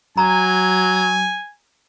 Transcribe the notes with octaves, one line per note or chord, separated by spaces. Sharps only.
F#3 G#5 A#5